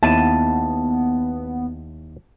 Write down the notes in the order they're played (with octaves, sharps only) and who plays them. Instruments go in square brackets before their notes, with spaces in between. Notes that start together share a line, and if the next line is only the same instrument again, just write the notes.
[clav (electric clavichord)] D#2 E4 [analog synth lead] B3 [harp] A5 D#7 E7